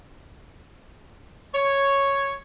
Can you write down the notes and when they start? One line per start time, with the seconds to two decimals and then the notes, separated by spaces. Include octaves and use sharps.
1.54 C#5